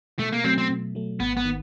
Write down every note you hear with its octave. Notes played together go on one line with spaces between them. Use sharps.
B2 A3
A#3
F#3 A3 C4
C4
B2
F#3 A3
G#1 B3
B3
D#3